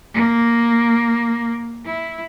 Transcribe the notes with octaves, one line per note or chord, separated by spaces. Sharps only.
A#3
E4